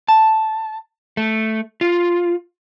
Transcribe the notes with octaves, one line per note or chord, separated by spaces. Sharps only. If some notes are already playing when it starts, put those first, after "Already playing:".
A5
A3
F4